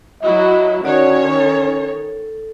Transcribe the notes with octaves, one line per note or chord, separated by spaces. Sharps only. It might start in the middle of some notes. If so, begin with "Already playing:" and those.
F#3 E4 F#4 D#5
D#3 C#4 F#4 C#5 D5 F#5
A4